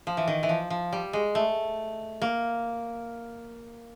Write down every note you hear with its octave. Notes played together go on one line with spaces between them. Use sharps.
F3
E3
D#3
E3
F3
F3
G3
G#3
A3
A#3